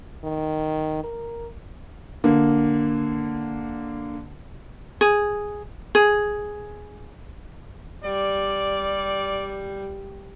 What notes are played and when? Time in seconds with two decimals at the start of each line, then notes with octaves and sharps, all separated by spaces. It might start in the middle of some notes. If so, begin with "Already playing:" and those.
0.24 D#3
1.04 A#4
2.24 D3 A#3
5.01 G#4
5.95 G#4
8.04 G3 D5